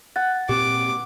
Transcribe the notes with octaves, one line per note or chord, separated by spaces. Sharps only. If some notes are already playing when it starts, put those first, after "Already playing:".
F#5 A6
A#2 C4 G4 D6